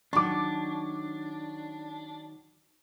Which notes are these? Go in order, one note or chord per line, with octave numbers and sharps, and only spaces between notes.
D#3 F#3 D4 C#6 D6